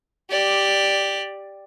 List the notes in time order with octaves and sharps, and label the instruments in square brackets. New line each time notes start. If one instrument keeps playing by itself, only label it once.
[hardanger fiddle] G4 D5